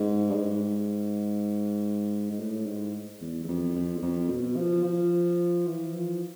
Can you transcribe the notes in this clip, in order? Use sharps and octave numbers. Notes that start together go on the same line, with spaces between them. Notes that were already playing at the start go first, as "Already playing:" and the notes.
Already playing: G#2
G2
G#2
G#2
A2
G#2
E2
E2
F2
F2
E2
F2
B2
F3
F3
E3
F3